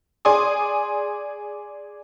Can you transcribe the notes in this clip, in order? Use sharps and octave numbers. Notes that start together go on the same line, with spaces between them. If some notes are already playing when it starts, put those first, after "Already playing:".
G#4 D5 G#5 C6 D#6